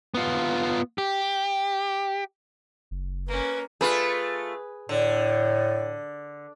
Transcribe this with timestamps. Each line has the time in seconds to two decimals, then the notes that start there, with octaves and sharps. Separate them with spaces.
0.14 B3 F4
0.98 G4
2.91 F#1
3.28 A#3 C#4 B4
3.81 A3 F4 G#4 B4
4.89 A2 D3